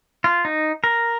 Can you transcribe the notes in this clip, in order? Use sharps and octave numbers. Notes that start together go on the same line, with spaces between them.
F4
D#4
A#4